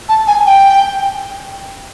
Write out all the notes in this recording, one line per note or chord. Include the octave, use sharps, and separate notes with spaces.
A5
G#5
G5